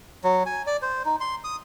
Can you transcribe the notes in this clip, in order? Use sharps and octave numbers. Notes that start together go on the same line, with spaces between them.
F#3
G#5
D5
C5
D#4
C6
D#6